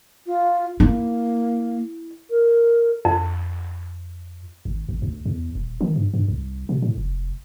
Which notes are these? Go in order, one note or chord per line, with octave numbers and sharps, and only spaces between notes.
F4
A#3 E4
A#4
F2
G#1
A1
D2
E2
D#1
D#3
G2
G2
C2
B2
A2
F1